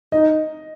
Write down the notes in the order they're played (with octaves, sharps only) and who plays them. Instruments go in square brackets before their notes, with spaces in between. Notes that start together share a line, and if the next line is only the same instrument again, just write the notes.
[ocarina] D#4 [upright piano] D#5